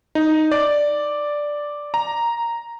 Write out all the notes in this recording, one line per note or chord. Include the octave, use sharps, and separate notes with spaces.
D#4
D5
A#5